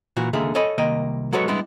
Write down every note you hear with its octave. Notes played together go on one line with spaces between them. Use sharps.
A#2 E3 F#4
C#2 D3 D#3 A#3 G#4 E5
A4 C#5 D#5 G#5 B5
C2 D#3 A#3 D#5 G5
F#3 G#3 F#4 A4 B4 C#5
G3 G#3 B3 D4 E4